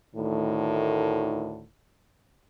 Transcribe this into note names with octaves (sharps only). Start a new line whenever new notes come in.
D2 A2 D#3